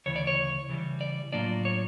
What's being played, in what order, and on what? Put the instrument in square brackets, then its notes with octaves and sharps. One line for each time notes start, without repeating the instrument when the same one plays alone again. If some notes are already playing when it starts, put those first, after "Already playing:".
[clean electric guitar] D2 C#3 E3 C#5
D5
C#5
C#3 E3 G3
D5
A2 F#3 A#3 D4 F4 D5
C#5